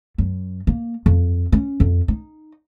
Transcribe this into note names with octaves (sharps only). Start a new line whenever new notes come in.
F#2
A#3
F2
C#4
F2
D#4